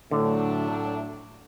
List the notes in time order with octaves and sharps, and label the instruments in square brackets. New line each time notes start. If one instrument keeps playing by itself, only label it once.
[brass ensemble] A2 F#3 A3 D4 [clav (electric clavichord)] D3